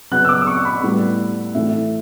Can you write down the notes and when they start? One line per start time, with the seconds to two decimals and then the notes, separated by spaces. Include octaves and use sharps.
0.11 C#3 F#3 B3 F#6
0.25 E6
0.29 D6
0.42 D6
0.47 C#6
0.65 B5
0.83 A2 G3 B3
1.55 A2 E3 A3 E5